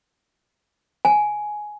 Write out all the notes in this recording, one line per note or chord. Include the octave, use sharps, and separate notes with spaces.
G#5